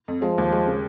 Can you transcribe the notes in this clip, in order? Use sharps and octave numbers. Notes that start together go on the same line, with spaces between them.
F2
F3 G#3
D#2
G#3
C#3